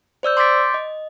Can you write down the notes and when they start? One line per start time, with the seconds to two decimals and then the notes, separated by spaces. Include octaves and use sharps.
0.23 C5 D5 E6 G6
0.37 C6 D6 G6 A6 B6 D7
0.74 D#5